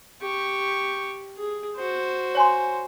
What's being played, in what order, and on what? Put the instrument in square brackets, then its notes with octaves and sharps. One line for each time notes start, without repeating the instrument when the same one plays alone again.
[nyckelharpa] G4 C#6
G#4
F#4 C5
[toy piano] C#5 G#5 C6